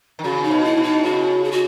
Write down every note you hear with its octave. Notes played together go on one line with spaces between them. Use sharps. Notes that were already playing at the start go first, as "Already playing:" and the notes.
D#3
C#3 F#4
D#4
B2
E4
B2
D#4
C#3 F#4
G#4
F#4